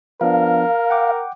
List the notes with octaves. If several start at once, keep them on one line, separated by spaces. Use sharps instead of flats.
F3 B3 D4 A#4 F5
F#5 G5 D6